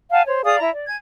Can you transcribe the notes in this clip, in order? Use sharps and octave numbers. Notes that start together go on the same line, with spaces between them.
F5 F#5 G#5 A5
C5 C#5
G#4 D5 F5 D#6
E4 E5 A#5
D5
G#5 G#6